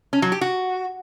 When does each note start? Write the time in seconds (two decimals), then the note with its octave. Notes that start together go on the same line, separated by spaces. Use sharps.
0.13 C#4
0.22 F#3
0.32 G4
0.41 F#4